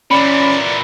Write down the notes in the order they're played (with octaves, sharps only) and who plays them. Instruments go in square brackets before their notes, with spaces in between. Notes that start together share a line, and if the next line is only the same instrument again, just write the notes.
[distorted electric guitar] A#2 E3 [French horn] C#4 [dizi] D5 [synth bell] B5